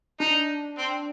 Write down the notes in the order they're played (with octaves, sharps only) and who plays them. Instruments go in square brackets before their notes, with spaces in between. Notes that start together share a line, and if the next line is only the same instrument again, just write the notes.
[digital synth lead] D4 [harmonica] D#4
[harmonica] C4